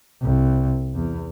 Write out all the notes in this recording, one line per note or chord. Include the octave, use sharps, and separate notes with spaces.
C2
E2